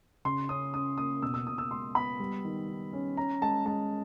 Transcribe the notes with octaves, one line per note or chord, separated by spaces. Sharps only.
C#3 C6
C#4 D#6
C#4 D#6
A#3 D#6
B2 E6
E6
B2 D#6
E6
G#3 C6
B3 B5
G3
D#3
D#3
C#4
C#4 A#5
G#3 A5
G#3 A5